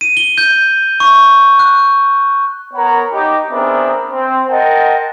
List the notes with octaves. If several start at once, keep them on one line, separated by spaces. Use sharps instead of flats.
D#7
G7
G6
C#6
F#6
B3 A#4 C#5 F#5 A#5 B5
D#4 G4
B3 C4 D4 G#4 A#4 E5
C4
A#4 D#5 F#5 G5 A5 C6